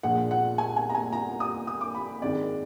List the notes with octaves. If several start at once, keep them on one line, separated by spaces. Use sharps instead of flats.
A#1 A#2 F3 G#3 F#5
F#5
G#5
G#5
A#5
G#5
A#5
D#6
D#6
D6
B5
G#1 F#2 D#3 G#3 D5